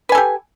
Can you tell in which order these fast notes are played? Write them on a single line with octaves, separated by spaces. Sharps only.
B4 G#5 A4 G4